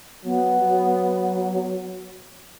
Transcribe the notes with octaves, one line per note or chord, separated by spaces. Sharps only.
F#3 B3
F#3